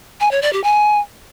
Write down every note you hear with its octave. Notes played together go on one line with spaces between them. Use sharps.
G#5
C#5
D5
G4
G#5